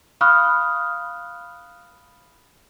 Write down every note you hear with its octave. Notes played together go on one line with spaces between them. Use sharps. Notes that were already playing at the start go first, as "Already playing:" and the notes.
F5 B5 C#6 D#6 F6 F#6